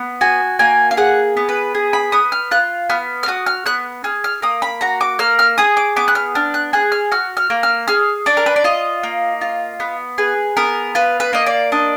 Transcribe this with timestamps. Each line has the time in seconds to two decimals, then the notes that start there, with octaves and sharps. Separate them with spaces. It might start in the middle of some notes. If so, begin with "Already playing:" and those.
Already playing: B3
0.21 F#4 G#5
0.59 A#3 G#5
0.91 F5
0.97 G#4 F#5
1.37 B3
1.49 B4
1.75 G#4
1.93 B5
2.12 B3 D#6
2.32 F6
2.51 F4 F#6
2.90 B3 F6
3.23 F6
3.28 F#4 D#6
3.46 F6
3.66 B3 F#6
4.04 G#4 F6
4.24 F6
4.42 A#3 D#6
4.62 B5
4.81 F#4 A#5
5.01 D6
5.19 A#3 F6
5.39 F6
5.58 G#4 D#6
5.77 D6
5.96 B3 D6
6.08 F#6
6.15 F6
6.35 D4 F6
6.54 F#6
6.73 G#4 F#6
6.92 F6
7.11 F#4 F6
7.37 F6
7.50 A#3
7.63 F6
7.88 G#4 F6
8.26 D4 D6
8.37 A#4
8.46 B4
8.56 D5
8.64 F4 D#5
9.03 A#3
9.41 F4
9.80 B3
10.18 G#4 B4
10.57 B3 A#4
10.95 F4 B4
11.20 B4
11.33 A#3 D#5
11.46 D5
11.72 D4 D#5